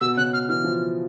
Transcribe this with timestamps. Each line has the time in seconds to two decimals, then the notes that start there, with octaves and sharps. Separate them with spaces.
0.01 B2 E6
0.17 C#3 F#6
0.33 F6
0.49 E3 F6
0.64 F3